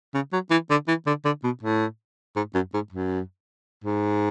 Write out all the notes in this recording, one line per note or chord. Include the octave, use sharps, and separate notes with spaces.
C#3
F#3
E3
D3
E3
D3
D3
B2
A2
G#2
F#2
G#2
F#2
G#2